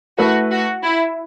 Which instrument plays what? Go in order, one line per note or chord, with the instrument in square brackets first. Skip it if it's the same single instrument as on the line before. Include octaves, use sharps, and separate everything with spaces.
[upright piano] A3 E4 B4 [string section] F#4
[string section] F#4
E4